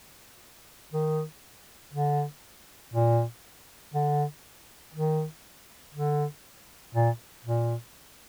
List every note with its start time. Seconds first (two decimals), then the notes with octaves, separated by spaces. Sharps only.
0.93 D#3
1.93 D3
2.94 A#2
3.94 D3
4.94 D#3
5.94 D3
6.95 A#2
7.45 A#2